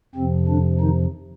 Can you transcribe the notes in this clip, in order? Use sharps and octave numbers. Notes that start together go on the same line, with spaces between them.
F2 C3 F3 C4
D3 D4
D#3 D#4